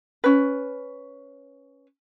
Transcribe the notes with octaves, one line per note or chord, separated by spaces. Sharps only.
C#4 B4